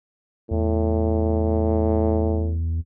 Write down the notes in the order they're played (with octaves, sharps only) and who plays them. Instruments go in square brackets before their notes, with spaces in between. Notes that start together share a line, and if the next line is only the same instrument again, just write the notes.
[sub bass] E2 [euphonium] A2